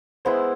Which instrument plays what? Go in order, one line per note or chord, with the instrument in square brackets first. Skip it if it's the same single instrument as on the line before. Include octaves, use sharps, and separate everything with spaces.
[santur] G#3 B3 E4 [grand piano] C5